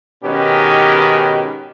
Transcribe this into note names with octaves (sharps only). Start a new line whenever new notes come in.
G#2 B2 D#3 C#4 G4 B4